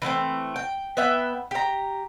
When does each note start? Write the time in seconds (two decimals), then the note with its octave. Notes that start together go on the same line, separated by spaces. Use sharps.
0.02 E3 A3 B3 C4
0.56 G5
0.97 B3 B4 E5 G5
1.51 G4 A#5